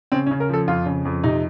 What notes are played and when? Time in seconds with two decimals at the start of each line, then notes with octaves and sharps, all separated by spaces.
0.12 C#3 C4
0.26 C#4
0.31 C#3
0.40 A#4
0.49 F3 A4
0.68 F2 F4
0.86 C#3
1.05 F2
1.24 C3 D#4